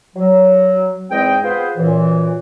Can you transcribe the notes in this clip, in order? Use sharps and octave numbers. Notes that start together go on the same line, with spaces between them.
F#3
E2 G#2 G#3 C4 D#5 G5
B3 F4 G#4 B4 C5
F#2 A#2 E3